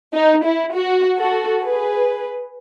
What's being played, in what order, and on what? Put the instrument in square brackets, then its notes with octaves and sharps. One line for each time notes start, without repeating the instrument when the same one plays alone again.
[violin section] D#4
E4
F#4
F#4 A4
G#4 B4